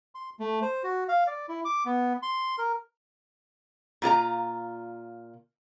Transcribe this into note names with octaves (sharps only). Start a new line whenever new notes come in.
C6
A3
C5
F#4
F5
D5
E4
D6
B3
C6
A#4
A#2 F4 A#4 A#5